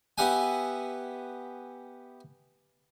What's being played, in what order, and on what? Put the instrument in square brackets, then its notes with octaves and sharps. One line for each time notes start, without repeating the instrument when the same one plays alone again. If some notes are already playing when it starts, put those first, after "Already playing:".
[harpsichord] B3 G4 E5 F#5 G#5